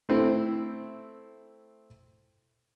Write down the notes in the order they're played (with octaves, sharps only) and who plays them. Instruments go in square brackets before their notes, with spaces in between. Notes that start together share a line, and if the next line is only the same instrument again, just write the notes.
[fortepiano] A3 C4 E4